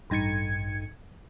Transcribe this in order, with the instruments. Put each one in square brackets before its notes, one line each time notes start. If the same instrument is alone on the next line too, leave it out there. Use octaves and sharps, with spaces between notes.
[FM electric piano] A1 G2 D#4 G#6 C#7